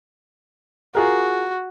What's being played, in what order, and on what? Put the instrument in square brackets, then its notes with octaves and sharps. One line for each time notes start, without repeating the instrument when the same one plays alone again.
[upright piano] F4 G#4 A#4 [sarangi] F#4